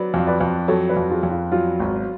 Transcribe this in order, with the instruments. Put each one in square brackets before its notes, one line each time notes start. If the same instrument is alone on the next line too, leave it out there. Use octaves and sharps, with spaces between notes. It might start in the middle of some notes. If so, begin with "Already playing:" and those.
Already playing: [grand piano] F#3 [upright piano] B4 D5
[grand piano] F2 [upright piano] F5
[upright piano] B4 D5
[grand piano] F2
[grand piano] F#3 [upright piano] A4 C#5
[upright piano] B4 D5
[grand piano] F2
[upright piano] F4 G#4
[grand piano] F2
[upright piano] F4
[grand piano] F#3 [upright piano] F4
[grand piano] G#1